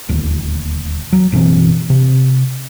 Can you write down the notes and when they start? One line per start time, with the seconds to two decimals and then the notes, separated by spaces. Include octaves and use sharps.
0.09 D#1 D2
1.13 F#3
1.32 F#1 B2 E3 C4
1.90 C3